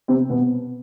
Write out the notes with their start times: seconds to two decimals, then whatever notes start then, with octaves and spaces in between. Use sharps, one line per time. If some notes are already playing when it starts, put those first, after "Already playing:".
0.08 C3 C4
0.30 B2 B3